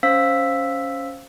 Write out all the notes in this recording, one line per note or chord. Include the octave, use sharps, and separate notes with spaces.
C#4 C5 F5 E6 B6